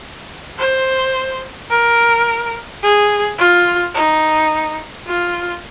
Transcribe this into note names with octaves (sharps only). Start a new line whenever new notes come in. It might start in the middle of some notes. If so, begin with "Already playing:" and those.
C5
A#4
G#4
F4
D#4
F4